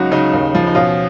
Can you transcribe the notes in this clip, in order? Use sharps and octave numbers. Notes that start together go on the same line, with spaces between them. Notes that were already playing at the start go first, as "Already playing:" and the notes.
Already playing: C#2 F#3 D#4 F#4
C#3 D#4
D#2
F3
D#4
B2 C#4 F4